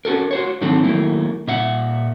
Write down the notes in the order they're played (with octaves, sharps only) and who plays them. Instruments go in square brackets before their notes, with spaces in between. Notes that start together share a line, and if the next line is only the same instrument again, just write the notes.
[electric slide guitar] C#4 F#4 A4 A#4
F#4 C5 C#5
G#2 D3 D#3 F#3 C4 A4
D#3 F#3 A3 A#3 E4
A#2 E5 F#5